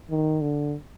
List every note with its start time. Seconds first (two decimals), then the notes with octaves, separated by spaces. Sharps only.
0.10 D#3
0.41 D3